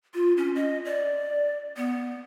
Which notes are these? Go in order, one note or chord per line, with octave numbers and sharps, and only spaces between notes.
F4
C#4
D#5
D5
B3